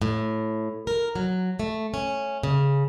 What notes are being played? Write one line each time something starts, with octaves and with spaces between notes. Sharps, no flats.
A2
A#4
F#3
A3
C#4
C#3